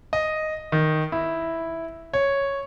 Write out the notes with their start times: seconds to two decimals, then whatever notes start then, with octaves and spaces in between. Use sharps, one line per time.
0.13 D#5
0.72 D#3
1.12 E4
2.13 C#5